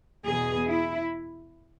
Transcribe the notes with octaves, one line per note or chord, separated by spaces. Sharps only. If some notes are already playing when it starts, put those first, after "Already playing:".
E2 B2 G#4
E4